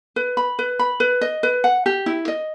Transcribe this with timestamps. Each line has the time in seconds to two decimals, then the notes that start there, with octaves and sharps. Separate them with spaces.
0.16 B4
0.37 B5
0.59 B4
0.79 B5
1.00 B4
1.21 D#5
1.43 B4
1.64 F#5
1.86 G4
2.06 E4
2.28 D#5